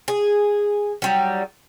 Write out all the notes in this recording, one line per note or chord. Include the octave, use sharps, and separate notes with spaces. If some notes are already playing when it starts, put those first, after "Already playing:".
G#4
F#3 G3 D#4